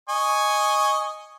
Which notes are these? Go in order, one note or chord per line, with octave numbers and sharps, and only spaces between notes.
D#5 G#5 C#6